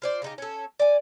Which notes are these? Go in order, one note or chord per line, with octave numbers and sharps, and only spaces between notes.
F4 C5 D5
C#3 D#4 G4
C#4 A4
D5 G#5